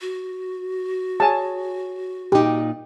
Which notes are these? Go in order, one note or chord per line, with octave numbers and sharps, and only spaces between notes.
F#4
G#4 C#5 G#5 A5
A#2 D#4 G4